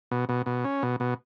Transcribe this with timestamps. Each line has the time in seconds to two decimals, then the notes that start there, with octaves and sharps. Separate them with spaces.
0.11 B2
0.29 B2
0.46 B2
0.65 C#4
0.83 B2
1.00 B2